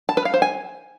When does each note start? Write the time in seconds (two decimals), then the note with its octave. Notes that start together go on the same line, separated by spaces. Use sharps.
0.09 A5
0.17 B4
0.25 F5
0.34 C5
0.42 G#5